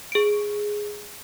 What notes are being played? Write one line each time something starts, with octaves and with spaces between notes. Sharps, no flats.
G#4 D7